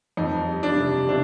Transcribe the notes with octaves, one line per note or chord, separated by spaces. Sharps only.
F2 D#4
G3
D4
C3
C3 D4